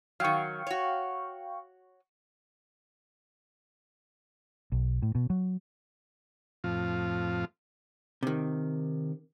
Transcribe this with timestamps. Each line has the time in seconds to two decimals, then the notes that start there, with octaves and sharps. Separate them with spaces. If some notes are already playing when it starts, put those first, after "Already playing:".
0.20 D#3 F#3 F5 G5 C#6
0.67 F#4 C#5
4.72 B1
5.03 A2
5.15 B2
5.30 F#3
6.64 F2 A2 F3 C4 F4
8.23 C3 D#3